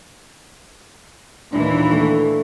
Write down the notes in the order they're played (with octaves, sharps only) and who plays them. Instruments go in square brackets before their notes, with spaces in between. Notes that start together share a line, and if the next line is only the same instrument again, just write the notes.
[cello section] D#2 A#2 E3 [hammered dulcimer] D4
[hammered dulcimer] A3